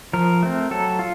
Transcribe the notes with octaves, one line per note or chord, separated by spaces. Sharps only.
F3 A#4
A3 C4
F#3 A4
F4